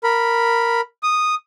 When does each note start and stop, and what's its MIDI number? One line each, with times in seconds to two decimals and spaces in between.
0.04 0.81 70
0.04 0.81 83
1.03 1.35 87